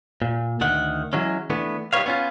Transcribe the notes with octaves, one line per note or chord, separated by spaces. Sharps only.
A#2
D2 D#3 F#5
E3 F#3 G#3 C#4
E3 A3 B3 D4
G3 D#4 A#4 B4 C#5 F5
B3 C#4 F4